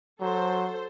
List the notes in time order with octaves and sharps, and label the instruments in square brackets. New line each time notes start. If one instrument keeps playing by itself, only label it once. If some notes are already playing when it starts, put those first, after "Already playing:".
[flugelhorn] F#3 [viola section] A4 C5